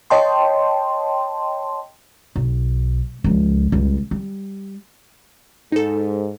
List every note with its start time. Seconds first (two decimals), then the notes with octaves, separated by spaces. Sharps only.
0.10 C#5 D#5 G5 A5 C6
2.36 B1
3.24 C#2 F3
3.72 C#2 G3
4.11 G3
5.72 G#2 D#4 A4